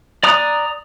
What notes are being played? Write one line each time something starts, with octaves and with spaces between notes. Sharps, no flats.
D5 A#5 D#6 F#6